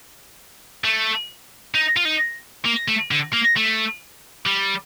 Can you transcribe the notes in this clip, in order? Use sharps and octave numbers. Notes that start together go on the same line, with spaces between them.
A3
D#4
F4
D#4
A#3
A3
D3
A#3
A3
G3